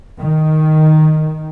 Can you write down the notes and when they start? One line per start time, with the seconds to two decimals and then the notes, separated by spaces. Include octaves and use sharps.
0.20 D#3